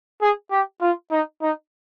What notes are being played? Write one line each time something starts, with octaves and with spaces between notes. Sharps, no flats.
G#4
G4
F4
D#4
D#4